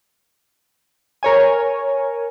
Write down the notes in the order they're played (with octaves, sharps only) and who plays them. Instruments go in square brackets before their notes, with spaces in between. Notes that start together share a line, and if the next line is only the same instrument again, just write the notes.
[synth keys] A#4 C#5 G#5